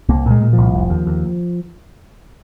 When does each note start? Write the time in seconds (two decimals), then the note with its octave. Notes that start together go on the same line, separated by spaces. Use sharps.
0.09 C2 A#3
0.26 A#2 G#3
0.42 A#2
0.53 F3
0.58 C2
0.74 F1
0.90 D#2
1.07 D#2